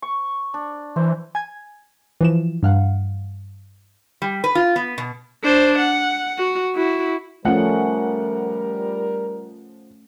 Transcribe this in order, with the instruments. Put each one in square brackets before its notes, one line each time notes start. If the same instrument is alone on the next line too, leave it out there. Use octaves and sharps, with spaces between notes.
[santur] C#6
D4
[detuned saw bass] E3 [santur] C5
[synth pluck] G#5 G#6
E3 F3 E7
G2 F5 F#5
[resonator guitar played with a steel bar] G3
B4
F4
B3
B2
[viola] D4 C5
F#5
F#4
E4 F#4
[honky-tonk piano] F3 F#5 [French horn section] G3 A#4 [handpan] A3 C#4